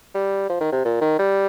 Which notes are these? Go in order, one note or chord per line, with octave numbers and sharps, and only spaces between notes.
G3
F3
D#3
C3
A#2
D#3
G3